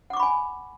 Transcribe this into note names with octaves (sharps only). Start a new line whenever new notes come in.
F#5 G#5 B5 C#6 D6